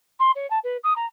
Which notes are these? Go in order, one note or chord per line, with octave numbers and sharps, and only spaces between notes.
C6
C#5
A5
B4
D#6
A#5